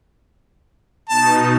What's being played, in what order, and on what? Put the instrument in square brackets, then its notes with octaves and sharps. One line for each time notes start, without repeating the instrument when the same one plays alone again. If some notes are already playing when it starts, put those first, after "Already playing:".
[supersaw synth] B2 D#4 [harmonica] A5